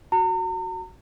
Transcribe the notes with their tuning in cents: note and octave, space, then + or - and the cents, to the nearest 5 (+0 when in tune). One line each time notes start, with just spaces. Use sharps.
F#4 +0 A#5 -40